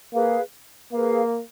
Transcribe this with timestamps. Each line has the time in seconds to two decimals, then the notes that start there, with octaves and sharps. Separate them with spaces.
0.13 A#3 G#4 B4 F5
0.92 A#3 G#4 B4 F5